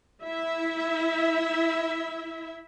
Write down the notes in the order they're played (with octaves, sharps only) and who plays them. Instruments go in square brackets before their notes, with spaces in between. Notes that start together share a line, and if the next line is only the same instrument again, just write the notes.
[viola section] E4 E5